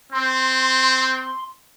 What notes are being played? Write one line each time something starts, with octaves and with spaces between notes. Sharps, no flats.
C4 C6